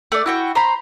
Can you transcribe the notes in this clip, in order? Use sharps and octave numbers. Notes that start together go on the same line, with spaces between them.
A3 D5
E4 F#4 G5
C5 A#5 B5